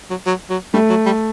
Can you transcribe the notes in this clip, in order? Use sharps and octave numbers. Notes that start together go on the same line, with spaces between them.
F#3
F#3
F#3
G3 A3
F#3
G3